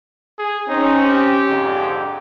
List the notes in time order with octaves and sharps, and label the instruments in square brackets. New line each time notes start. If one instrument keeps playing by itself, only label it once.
[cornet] G#4
[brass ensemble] C4 C#4 [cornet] D#4
[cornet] G4
[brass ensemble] F2 G#2 D3